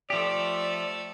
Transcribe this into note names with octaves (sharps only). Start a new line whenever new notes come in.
F3 A3 G4 A4 D5